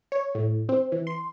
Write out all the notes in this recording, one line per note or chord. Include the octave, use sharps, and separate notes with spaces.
C#5
A2
C4
E3
C6